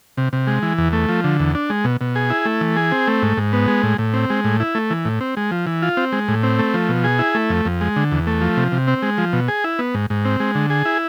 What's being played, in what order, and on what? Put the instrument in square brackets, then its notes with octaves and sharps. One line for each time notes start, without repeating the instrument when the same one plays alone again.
[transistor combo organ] C3
C3
G#3
E3
E2
A3
F3
D3
E2
D4
G#3
B2
B2
G#4
E4
A3
E3
G#4
C4
A3
G#2
G#2
B3
G#3
A2
A2
C4
G#3
A2
E4
A3
E3
A2
C4
G#3
F3
E3
F4
C4
G#3
A2
C4
A3
F3
B2
G#4
E4
A3
F2
F2
G#3
D3
E2
A3
F3
C3
C3
C4
G#3
F3
B2
G#4
E4
B3
G#2
G#2
C4
G#3
D3
G#4
E4